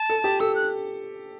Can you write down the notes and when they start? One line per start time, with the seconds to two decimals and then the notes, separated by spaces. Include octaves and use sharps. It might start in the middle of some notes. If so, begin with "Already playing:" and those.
Already playing: A5
0.10 A4
0.24 G4
0.40 A4 E6
0.55 F#6